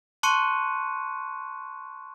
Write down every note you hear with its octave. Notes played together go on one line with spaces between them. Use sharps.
A5 C6 C#6 F#6 C#7 D#7